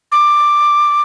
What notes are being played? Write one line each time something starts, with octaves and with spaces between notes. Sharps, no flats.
D6